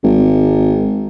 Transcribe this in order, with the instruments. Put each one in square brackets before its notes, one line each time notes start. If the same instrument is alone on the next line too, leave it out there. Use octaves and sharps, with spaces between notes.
[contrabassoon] G#1